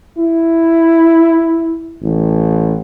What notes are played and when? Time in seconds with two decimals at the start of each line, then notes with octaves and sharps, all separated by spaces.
0.17 E4
2.01 A1